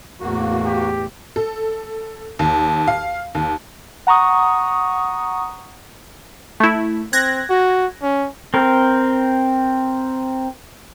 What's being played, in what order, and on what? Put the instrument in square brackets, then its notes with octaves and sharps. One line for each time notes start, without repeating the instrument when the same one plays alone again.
[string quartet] E2 A2 [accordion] A#3 F#4
[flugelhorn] G4
[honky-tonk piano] A4
D#2
F5
D#2
[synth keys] F#5 A#5 C#6 D#6
[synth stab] A3 E4
[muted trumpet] C4 [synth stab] F#6 G#6 A#6
[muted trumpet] F#4
C#4
[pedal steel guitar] C4 A#4